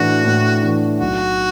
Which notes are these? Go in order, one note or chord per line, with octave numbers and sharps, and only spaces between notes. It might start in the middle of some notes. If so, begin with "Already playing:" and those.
Already playing: A2 E3 D4 F#4
A2
E3 D4
B1 F#4